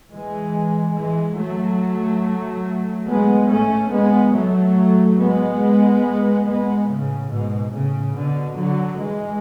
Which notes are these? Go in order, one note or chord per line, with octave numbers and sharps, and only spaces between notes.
E3 G#3
E3 G#3
F#3 A3
G#3 B3
A3 C#4
G#3 B3
F#3 A3
G#3 B3
G#3 B3
A2 C#3
G#2 B2
A2 C#3
B2 D3
D3 F#3
E3 G#3